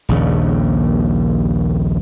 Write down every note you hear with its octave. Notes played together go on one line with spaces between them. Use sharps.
A#1 D#2 C#3